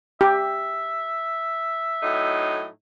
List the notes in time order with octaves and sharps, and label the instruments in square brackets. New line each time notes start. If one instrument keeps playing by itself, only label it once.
[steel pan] G4 [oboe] E5
[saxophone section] A2 F#3 D#4